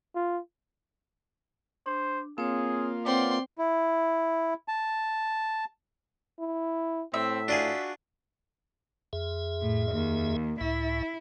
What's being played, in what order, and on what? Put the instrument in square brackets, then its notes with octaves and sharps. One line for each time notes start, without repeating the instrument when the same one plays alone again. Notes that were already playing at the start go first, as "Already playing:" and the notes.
[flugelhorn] F4
[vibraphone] D4 [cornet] C5
[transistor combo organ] A#3 F4 [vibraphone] C4 C#5 [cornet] G#4
[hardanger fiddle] C4 C6 [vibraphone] B4 C#5 F#5 [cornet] D5
[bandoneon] E4
A5
[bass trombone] E4
[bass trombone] A2 [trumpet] C4 [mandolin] E5
[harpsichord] D4 F4 G#4 [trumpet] F#4
[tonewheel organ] F2 G#4 E5
[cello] A2
D#2
[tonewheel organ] C#2 A2 E5 [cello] E4